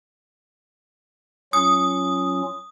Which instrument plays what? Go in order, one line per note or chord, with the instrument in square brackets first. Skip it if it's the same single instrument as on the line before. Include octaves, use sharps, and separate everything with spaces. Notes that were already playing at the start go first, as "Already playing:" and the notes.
[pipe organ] F#3 C#4 F4 [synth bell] D#6